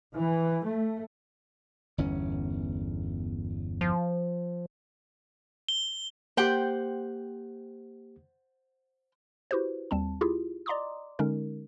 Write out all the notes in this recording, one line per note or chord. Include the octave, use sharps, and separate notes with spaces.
E3
A3
G1 E2 C#4
F3
G7
A#3 G4 C5 F#5 G5
E4 F#4 G4 B4 C5
D#2 G3 C4 A5
E4 F4 G4 G#4
D5 D#5 A#5 C6 D6 D#6
D3 G#3 C#4 D#4 A#4